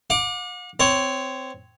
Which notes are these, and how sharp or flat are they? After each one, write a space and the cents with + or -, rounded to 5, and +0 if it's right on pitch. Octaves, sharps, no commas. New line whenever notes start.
F#5 -45 D6 +5
C4 -15 C#5 +0